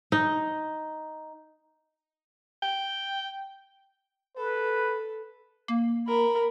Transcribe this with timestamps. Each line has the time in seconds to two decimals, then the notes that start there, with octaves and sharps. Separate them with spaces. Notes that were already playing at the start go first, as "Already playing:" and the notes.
0.12 D#4
2.62 G5
4.37 A4 B4
5.68 A#3
6.08 A#4 B5